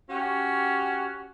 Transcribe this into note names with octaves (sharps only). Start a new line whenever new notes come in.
C#4 F#4 G4